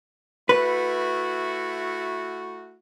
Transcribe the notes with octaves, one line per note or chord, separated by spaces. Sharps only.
A3 E4 F#4 B4